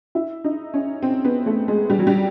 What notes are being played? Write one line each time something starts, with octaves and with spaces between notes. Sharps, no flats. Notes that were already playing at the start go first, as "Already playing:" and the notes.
E4
D#4
C#4
C4
B3
A3
G#3
G3
F#3
G3